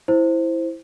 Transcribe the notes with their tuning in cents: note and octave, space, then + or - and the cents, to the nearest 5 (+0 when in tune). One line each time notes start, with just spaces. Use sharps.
E4 +0 C5 +0